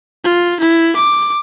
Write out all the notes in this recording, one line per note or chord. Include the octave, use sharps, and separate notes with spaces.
F4
E4
D6